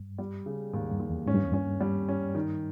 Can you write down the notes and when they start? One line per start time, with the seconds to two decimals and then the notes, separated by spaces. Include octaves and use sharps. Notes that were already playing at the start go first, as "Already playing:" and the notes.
Already playing: G2
0.18 G3
0.46 C#3
0.73 D#2 G#2
0.91 G2
1.00 D#2
1.09 E2
1.27 G#2 C#4
1.35 G2
1.43 E2
1.52 G2 C#4
1.81 G3
2.09 C#4
2.35 D#3